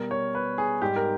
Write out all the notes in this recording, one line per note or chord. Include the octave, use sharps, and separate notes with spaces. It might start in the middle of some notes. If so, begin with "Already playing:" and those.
Already playing: B2 G3 A#4
C#5
B4
G#4
G#2 G3 G4
A#4